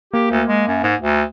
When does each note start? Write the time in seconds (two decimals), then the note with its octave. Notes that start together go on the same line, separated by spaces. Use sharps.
0.13 A#3 G4
0.31 D2
0.48 G#3
0.68 F#2
0.84 G#2
1.00 D2